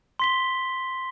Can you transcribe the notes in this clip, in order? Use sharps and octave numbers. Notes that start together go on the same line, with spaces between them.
C6 B6 G7